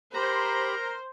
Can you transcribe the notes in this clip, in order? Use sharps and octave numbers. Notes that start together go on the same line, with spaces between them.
G4 A#4 C5 A#5 B5